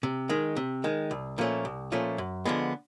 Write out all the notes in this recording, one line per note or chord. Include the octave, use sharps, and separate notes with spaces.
C3
D#3 G#3
C3
D#3 G#3
C2
A#2 F3 A3 C#4
C2
A#2 F3 A3 C#4
F#2
D3 F3 G#3 B3